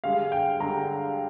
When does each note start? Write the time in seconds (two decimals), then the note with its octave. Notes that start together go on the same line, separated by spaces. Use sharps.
0.04 G2 D3 G#3 F5
0.32 G5
0.60 G2 D3 G#3 A#5